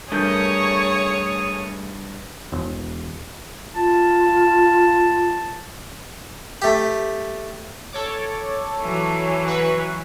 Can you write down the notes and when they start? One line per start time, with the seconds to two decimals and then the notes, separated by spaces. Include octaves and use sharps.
0.12 G2 A3 G#4 A#4 C#5 C#6 D#6 G6
2.52 E1
3.76 F4 A5
6.62 A3 G4
7.93 A4 C#5 D6
8.82 E3 F#3
9.46 F#4 B4 C#6